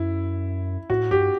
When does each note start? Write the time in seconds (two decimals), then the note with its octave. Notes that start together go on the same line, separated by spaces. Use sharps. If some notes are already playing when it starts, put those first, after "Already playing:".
Already playing: F#2 E4
0.90 A2 F#4
1.11 G2 G4